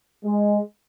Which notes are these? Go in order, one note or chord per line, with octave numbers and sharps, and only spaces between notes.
G#3